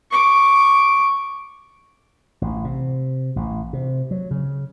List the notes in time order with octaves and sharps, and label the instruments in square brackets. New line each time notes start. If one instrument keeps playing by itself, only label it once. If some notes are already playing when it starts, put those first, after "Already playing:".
[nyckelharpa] C#6 D6
[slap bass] A1
C3
A1
C3
F#3
C#3